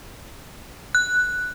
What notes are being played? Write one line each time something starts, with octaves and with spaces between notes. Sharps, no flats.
F#6